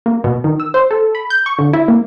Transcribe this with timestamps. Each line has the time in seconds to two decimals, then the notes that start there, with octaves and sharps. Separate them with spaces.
0.06 A#3
0.24 B2
0.44 D#3
0.60 E6
0.74 C5
0.91 A4
1.15 B5
1.30 G6
1.46 C#6
1.59 D3
1.73 E4
1.88 A#3